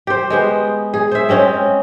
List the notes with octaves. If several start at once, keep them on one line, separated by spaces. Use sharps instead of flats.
G4 C5
G#3 B3 C5
G#4
C5 E5
G#3 C4 C#4 D#5